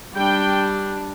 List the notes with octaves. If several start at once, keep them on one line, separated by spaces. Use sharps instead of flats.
G3 D4 G5